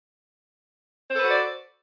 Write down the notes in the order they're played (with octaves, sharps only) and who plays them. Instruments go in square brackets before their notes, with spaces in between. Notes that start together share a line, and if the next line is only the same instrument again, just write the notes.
[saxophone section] C5
A4
B4
F#4
D5